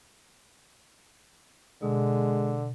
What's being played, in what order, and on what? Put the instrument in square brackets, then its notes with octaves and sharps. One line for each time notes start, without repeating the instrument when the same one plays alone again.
[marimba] B2 [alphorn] D3 [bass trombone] G#3